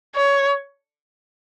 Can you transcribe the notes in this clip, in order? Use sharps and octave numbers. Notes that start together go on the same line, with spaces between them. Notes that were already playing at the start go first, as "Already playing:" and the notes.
C#5